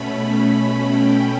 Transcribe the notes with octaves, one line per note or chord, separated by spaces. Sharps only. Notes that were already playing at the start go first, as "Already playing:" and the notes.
Already playing: B2 A3 C#4 B5
G5